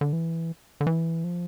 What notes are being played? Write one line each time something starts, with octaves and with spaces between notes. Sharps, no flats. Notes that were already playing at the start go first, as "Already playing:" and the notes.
D3
E3
D3
E3
F3